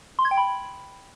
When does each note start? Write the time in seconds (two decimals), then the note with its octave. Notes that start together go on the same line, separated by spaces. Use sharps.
0.19 C6
0.25 G#6
0.31 G5
0.37 B5